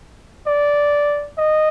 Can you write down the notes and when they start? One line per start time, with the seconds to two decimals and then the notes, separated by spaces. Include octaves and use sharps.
0.47 D5
1.38 D#5